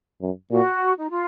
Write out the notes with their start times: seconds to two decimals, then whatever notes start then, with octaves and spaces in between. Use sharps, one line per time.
0.21 F#2
0.51 A#2 F#4
0.99 D#4
1.10 F4